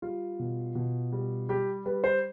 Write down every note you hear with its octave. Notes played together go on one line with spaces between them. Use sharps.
G3 F4
B2
B2
G3
G3 G4
G3 B4
C5